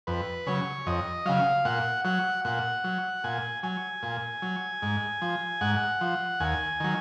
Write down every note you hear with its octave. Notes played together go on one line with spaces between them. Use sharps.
F2 B4
C#3 F#3 C#5
F2 D#5
C#3 F#3 F5
A#2 F#5
F#3 F#5
A#2 F#5
F#3
A#2 G#5
F#3 G#5
A#2
F#3
G#2
F3
G#2 F#5
F3
D#2 G#5
D#3 F#3